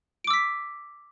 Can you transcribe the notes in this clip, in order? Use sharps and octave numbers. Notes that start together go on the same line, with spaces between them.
D6 E6 B6 D7